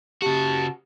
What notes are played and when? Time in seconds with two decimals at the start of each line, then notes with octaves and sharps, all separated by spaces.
0.22 C#3 F#4 G4 A5